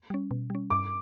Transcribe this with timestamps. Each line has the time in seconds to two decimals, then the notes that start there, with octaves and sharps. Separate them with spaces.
0.10 G3 C#4
0.31 B2
0.50 G3 C#4
0.70 G2 D6